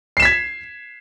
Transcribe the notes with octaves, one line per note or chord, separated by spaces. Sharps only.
G#6 B6 C7 E7